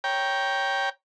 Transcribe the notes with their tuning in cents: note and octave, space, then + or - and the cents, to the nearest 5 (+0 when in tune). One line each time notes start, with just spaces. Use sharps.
C#5 +0 G5 +0 A#5 +20